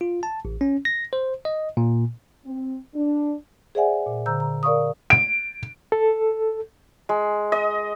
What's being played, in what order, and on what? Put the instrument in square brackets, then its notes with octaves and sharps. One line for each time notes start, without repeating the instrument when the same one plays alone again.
[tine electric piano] F4
A5
A1
C#4
A#6
C5
D#5
A#2
[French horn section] C4
D4
[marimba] G#4 C5 D5 E5 F#5 G#5
A#2
D3 C5 A#5 E6 G6
A#5
A#4 D5 F5 C#6 D#6
[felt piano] D7
[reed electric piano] A4
[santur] G#3
D#5